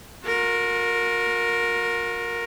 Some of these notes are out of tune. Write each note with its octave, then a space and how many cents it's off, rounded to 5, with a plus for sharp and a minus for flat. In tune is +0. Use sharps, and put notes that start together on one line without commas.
F#4 -45 A#4 +0